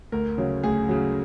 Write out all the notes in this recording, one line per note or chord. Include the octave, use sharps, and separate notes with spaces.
D2 A#4
C#3 F#3
D2 G#4
C#3 F#3